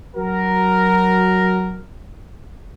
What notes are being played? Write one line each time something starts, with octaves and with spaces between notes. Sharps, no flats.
F#3 F#4 A#4